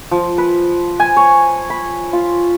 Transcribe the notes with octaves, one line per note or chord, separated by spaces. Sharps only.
F3
B4
G#5
C#5
B5
F4